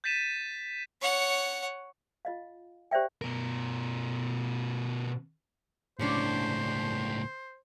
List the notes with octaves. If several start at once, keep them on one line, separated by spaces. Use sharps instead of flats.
G6 A6 B6 D#7 E7
C#5 F#5
F4 D#5 F5
G4 C5 D5 E5 G5
B2 A#4
C#2 A2 C3 C#4 D4 C5